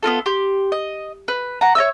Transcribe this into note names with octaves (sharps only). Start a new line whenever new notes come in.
B3 C4 F4 A4
G4 C6
D#5
B4
F#5 A#5
C#5 D#5 E5 E6